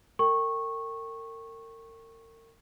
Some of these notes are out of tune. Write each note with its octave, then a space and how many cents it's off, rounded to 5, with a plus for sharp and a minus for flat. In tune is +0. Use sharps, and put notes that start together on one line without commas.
A#4 -40 G5 +0 C#6 -15